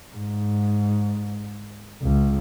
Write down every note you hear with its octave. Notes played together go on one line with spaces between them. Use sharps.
G#2
C#2